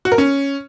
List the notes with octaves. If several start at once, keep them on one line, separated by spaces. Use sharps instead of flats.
F#4
A#4
C#4